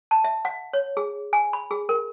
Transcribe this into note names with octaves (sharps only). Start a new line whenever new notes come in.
A5
E5
F#5
C#5
G#4
G#5
B5
G#4
A#4